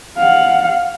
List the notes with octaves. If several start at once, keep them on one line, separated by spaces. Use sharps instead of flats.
F5 F#5